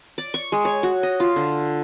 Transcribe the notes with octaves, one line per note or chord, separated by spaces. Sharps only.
D5
C#6
G#3
C#5
F#4
D#5
F4
D3